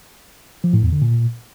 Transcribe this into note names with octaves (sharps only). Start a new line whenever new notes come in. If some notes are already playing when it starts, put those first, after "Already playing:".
F3
A2
E2
D3
A#2